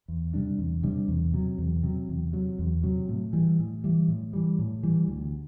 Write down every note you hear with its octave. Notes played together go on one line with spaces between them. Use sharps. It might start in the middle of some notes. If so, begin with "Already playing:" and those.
E2
C3 G3 D4
E2
C3 G3 D4
E2
C3 F#3
E2
C3 F#3
E2
C3 F#3
E2
C3 F#3
A2
E3 G3
A2
E3 G3
A2
E3 G3
A2
E3 G3
D2